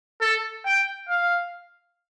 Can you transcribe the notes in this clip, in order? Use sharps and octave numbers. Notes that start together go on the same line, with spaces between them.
A4
G5
F5